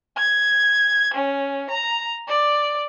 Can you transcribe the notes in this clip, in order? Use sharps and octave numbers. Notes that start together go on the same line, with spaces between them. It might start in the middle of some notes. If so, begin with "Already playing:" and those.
G#6
C#4
A#5
D5